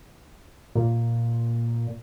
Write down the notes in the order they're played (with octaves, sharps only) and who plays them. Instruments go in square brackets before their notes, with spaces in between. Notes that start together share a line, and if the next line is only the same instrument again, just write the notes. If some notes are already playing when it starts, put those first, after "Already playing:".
[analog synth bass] A#2